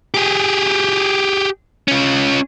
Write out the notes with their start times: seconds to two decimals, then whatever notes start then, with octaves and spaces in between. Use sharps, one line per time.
0.14 G4 G#4
1.88 C#4 F4